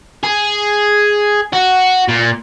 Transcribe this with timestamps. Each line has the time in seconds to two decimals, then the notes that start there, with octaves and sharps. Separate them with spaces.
0.24 G#4
1.53 F#4
2.08 A#2